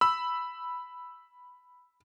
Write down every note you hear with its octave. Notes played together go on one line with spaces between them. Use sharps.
B5 E6